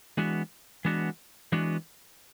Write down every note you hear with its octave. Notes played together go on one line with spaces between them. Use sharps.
E3 G#3 B3 D4 F#4
E3 G#3 B3 D4 F#4
E3 G#3 B3 D4 F#4